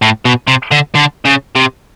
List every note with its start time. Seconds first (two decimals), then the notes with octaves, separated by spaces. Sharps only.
0.02 A2
0.25 B2
0.48 C3
0.71 D3
0.95 D3
1.25 C#3
1.56 C3